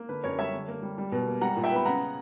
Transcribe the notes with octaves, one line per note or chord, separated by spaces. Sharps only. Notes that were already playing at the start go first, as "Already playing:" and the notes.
Already playing: A#3
D3 B4
F#2 A#4 C#5
G3 C#5 E5
D3
A#3
G3
G3
B2
A#3
G3 F#5 A#5
A#2
E5 G5
B3 B5
C#3 F#5 A#5